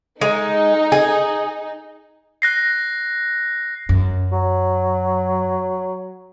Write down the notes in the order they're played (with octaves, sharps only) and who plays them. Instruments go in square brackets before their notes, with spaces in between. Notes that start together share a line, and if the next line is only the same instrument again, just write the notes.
[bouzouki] G#3 [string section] D#4
[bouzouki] G#4
[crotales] F#6 A#6 C7
[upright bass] F#2
[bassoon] F#3